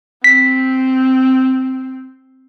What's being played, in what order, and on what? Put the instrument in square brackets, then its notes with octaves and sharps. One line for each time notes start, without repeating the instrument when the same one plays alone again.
[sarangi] C4 [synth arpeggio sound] B6